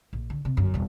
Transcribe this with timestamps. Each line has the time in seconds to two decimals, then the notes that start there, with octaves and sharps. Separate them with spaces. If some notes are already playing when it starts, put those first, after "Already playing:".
0.13 A#1
0.30 D3
0.45 C3
0.57 G1 F#2
0.74 E1 G3